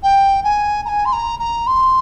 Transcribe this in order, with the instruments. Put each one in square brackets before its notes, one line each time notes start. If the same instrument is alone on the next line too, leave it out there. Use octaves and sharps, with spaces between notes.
[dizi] G5
G#5
A#5
G#5
C6
A#5
A#5
C6